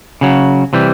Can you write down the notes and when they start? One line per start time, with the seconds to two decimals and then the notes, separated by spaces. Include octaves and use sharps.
0.21 C#3 F#3
0.73 C3 E3 G3